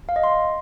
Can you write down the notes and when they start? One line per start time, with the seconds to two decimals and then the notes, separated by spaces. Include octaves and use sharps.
0.09 F5
0.16 D#5
0.23 C6